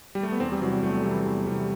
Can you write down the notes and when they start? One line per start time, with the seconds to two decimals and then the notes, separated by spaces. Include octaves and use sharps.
0.15 G3
0.23 A3
0.32 B3
0.40 E2 C4
0.52 G3
0.62 C3 E3 F#3
0.72 G3
0.83 E2 A3
1.04 C3 E3 G3
1.25 E2
1.47 C3 E3 G3